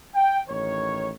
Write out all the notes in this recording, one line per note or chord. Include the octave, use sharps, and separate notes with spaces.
G5
A1 D#3 C#5